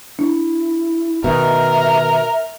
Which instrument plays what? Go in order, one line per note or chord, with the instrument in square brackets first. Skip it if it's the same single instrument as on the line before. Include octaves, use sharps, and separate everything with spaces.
[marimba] D4 [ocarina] E4
[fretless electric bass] B2 D#3 [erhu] A#4 [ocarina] E5